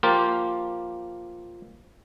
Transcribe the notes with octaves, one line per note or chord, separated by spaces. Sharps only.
F3 A#3 F4 G4